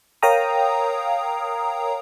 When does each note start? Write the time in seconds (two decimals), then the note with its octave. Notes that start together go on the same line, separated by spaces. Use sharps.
0.22 A#4 C#5 F5 G5 A#5 D#6